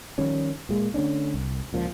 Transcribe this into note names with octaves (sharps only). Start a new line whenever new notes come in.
D#3 F3 G3 C#4
A#2 G#3 A#3
D3 A3 C#4 D4
C2
C#2 A#2 E3 F3